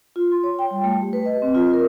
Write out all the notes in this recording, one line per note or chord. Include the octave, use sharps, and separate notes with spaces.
F4
C6
C#5
G5
G3
A3
G4
B4
D#5
C4
F4
A#4